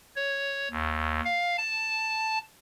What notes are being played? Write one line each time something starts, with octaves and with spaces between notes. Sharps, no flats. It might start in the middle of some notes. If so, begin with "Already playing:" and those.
C#5
D#2
F5
A5